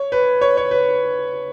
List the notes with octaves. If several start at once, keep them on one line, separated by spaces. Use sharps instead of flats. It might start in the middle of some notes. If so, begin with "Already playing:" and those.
Already playing: C#5
B4
C#5
C#5
B4